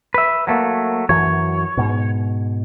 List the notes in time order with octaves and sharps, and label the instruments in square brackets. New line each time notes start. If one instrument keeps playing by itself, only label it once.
[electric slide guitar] B4 E5
F#3 A3 A#3
[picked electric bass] F#2 E3 F#3 [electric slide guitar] C#5
[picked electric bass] G#2 B2